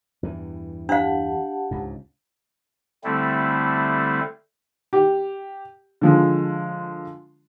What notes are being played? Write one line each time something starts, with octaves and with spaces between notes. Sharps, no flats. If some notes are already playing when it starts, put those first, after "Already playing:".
E2 G2 E3
D4 G4 F5 F#5 A5
C#2 G#2
D3 G3 A3 C4 E4
G4
D3 F3 G#3